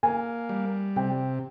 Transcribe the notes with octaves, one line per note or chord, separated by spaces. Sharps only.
A#3 G#5
G3
C3 G5